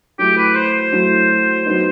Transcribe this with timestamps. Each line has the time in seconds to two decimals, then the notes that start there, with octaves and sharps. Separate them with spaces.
0.19 F#3 A3 E4 G4
0.37 B4
0.55 C5
0.74 C5
0.92 F#3 A3 E4
1.65 F#3 B3 D#4